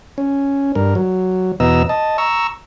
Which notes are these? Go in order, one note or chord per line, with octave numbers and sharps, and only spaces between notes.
C#4
G2 A#4
F#3
E2 B2 B3 D#5 A#5 E6
D#5 A5
A#5 C#6 E6